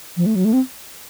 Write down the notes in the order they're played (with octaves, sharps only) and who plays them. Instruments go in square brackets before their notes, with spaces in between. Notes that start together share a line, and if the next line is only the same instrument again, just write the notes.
[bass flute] F3
A3
F#3
A3
C4